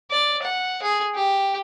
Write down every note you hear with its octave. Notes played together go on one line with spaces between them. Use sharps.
D5
F#5
G#4
G4